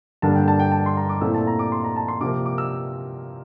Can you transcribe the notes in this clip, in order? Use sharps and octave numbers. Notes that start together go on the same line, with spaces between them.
G2 D3 G3 A#3 D4 A5
G5
A5
G5
A5
C6
A#5
D6
A#2 A3 C4 E4 E6
A5
A#5
D6
C6
A#5
A5
C6
C3 F3 A#3 D6
D6
E6